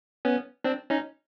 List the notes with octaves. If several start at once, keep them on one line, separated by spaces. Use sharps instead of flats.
B3 C#4
C4 D4
C#4 D#4